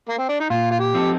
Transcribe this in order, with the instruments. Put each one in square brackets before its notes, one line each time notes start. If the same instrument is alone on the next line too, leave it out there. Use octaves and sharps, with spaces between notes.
[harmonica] A#3
C4
D4
D#4
[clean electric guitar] A#2 [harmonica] F4
[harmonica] F4
G4
[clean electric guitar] F3 C4 D#4 A4